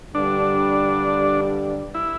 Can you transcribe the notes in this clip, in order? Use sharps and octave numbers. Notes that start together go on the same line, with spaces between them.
G2 D3 G3 D4
E4